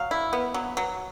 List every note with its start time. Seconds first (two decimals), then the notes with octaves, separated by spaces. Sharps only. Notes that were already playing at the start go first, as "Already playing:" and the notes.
Already playing: F#3 F5
0.11 E4
0.33 B3
0.54 F#3
0.77 F#3